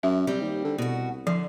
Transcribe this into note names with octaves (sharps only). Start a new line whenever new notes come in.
F#2 E5
C3 G3 C4
D#2
D3
C2 B2 F#4
D3 F3